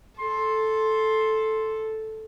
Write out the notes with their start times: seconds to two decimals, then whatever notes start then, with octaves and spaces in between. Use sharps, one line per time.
0.19 A4 C6